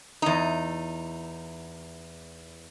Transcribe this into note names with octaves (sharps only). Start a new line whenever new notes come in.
E2 D#4